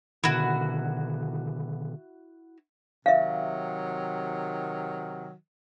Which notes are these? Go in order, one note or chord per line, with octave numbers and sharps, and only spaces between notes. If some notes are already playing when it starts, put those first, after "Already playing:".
B2 D3 D#3 E4 F#4
C3 D#3 F#3 E5 F5